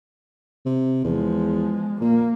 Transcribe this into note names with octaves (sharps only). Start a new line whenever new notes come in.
C3
E2 F3 G#3
A#2 A#3